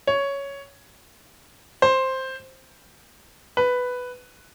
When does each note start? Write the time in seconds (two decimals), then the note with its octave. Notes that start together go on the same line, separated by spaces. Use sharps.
0.07 C#5
1.82 C5
3.57 B4